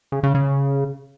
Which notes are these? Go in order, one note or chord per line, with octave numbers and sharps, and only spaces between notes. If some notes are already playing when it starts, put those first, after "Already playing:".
C#3
C#3
C#3